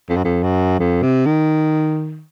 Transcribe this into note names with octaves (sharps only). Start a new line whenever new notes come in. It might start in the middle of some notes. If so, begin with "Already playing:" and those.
F2
F#2
F2
F#2
F2
C3
D#3